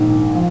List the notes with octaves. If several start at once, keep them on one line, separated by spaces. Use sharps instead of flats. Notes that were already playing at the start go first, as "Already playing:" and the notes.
Already playing: A#1 G#2 D#3
F3